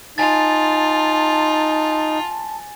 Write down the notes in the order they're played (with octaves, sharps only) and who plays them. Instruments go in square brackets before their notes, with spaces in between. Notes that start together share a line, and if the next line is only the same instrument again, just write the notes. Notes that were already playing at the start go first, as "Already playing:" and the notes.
[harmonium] D#4 [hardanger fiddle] F4 [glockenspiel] G#5 A6 [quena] A5